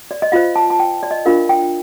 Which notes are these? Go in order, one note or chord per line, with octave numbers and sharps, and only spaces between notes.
D5
D#5
F4 C5 F5
A5
A5
G5
D5
D#5
D4 F4 A#4 F5
G5